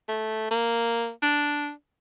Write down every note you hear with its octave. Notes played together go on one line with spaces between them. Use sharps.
A3
A#3
D4